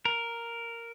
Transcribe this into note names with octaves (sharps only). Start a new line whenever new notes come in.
A#4